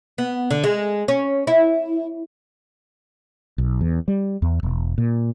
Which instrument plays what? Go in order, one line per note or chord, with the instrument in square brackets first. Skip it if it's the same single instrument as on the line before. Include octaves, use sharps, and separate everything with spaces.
[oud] B3
D3
G#3
C#4
E4
[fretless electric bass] B1
E2
G3
E2
E1
A#2